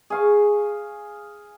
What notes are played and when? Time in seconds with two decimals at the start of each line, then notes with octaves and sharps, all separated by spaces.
0.10 G#4 F5 C#6